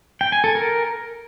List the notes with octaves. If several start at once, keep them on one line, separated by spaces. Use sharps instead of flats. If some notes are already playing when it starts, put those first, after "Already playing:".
G5
G#5
A4
A#4